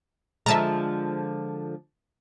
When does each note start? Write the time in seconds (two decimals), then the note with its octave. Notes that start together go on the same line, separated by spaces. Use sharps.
0.46 D3 F3 G#3 E5 A5 A#5